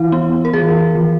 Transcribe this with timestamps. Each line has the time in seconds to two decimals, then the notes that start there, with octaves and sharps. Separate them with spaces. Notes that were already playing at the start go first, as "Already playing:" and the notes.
Already playing: E3 E4
0.12 B3
0.45 A#4
0.53 E3 G#4
0.95 E3